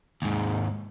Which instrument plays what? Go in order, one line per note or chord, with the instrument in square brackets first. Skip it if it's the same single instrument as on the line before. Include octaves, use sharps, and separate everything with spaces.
[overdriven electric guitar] D#2 G#2